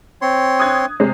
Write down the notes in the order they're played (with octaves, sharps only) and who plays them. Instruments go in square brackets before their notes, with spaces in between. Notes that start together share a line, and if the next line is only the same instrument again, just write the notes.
[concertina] C4 C#5 C6
[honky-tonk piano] D#6 F#6 G#6
C3 G#3